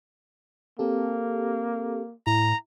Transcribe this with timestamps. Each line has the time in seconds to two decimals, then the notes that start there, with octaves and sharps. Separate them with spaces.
0.79 A#3 C4 G4 A4
2.27 A2 E4 A#5